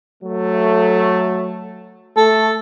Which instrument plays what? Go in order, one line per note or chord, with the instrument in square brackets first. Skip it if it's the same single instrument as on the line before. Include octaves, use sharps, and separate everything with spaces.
[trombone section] F#3 A3
[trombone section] A3 [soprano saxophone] A4